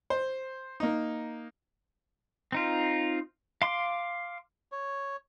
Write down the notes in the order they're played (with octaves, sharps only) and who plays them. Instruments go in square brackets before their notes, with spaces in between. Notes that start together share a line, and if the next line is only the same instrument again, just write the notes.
[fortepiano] C5
A#3 D#4
[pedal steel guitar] C4 D#4 F4
F5 C6 D6
[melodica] C#5